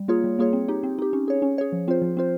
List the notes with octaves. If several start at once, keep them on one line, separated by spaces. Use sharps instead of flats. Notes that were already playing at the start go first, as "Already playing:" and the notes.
Already playing: G3
A#3 F4 G#4 C#5
G3
A#3 F4 G#4 C#5
C4
D#4 G4
C4
D#4 G4
C#4
G#4 C#5
C#4
G#4 C#5
F3
C4 F4 C5
F3
C4 F4 C5